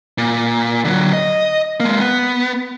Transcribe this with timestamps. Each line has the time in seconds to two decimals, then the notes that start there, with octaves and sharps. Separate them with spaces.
0.18 A#2
0.85 D3 F#3
1.13 D#5
1.80 G#3 A#3
2.00 B3